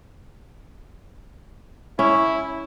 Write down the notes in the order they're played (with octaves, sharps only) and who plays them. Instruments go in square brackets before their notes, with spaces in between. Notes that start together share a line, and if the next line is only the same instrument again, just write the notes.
[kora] C#4 [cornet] E4